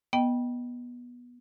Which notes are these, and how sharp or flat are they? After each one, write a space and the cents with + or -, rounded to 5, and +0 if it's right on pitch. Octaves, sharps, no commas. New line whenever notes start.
B3 -15 D#5 +0 G5 +0